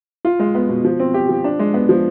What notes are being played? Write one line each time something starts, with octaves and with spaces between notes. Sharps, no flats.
F4
G#3
B3
B2
F3
C4
G4
F3
D4
G#3
B3
F3